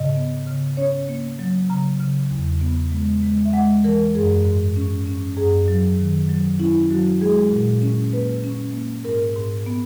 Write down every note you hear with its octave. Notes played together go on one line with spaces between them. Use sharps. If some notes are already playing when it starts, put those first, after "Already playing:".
Already playing: G#2 C#3 D#5
B3
C#3
C#4 C#5
A#3
F#3
C#3 A#5
C#3
E2
B3
G#3
G#3
E5
G#3 F#5
E3 A#4
F#2 G#4
G#2
C#4
C#4
F#2 G#4
F#3
D#3
F#3
C#4 E4
F#3 F#4
G#3 G#4
A#2
C#4
A#3 B4
C#4
A#3
G#2 A#4
G#2
B3